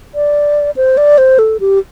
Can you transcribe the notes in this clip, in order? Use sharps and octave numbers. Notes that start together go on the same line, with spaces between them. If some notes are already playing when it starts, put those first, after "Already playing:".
D5
C5
D5
C5
A4
G4